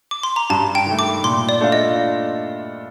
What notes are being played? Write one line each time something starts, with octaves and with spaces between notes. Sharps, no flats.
D6
C6
A#5
G2 A5
G5
D#3 A3
D6
A#2 C6
D5
A3 D4 F4
D#5